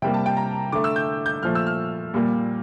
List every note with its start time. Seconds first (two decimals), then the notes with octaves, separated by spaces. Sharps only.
0.02 C3 G3 A#3 G5
0.14 A5
0.26 G5
0.37 A#5
0.72 D3 A3 D6
0.84 E6
0.96 G6
1.26 G6
1.43 A#2 F3 A3 F6
1.55 E6
1.67 F6
2.14 A#2 G3 A#3